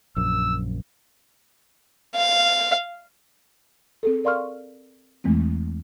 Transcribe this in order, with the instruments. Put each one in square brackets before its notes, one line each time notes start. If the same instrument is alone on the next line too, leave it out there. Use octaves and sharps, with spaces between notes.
[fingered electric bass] A#1 F#2 [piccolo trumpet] E6
[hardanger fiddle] F5
[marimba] C4 G#4 A4
A#4 D5 F5 C6 C#6 F6
E2 E3 G#3 A3 C4